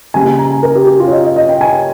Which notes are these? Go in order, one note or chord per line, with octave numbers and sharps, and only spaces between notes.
C#3 G3 A#3 G#5
G#5
A#5
G#5
A#4
G4
G4
F4
C#5
D#5
D#5
D#5
G5
G#5